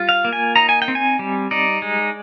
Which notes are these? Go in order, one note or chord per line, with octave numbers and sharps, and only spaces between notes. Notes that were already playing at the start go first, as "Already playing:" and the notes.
Already playing: G3 F4
F5
A#3
G#5
D#4 A#5
G#5
G5
C4
G#5
G3
D#4 D5
G#3